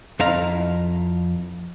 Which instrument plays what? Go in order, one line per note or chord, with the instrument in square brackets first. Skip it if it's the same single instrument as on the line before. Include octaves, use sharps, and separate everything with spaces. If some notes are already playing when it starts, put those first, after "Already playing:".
[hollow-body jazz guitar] F2 E4 F5 A#5